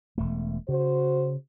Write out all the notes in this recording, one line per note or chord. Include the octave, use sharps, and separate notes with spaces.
E1 A3
C#3 F#4 C5